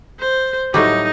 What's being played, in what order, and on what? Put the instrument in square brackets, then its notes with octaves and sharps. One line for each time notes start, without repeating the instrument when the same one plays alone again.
[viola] C5
[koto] A2 F#3 G3 [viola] D#4